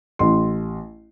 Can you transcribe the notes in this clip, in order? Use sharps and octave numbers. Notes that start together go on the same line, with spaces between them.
A1 C6